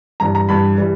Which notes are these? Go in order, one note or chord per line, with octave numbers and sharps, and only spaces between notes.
G2 E3 G3 A#5
A#5
G2 E3 G3 B5
E3 G3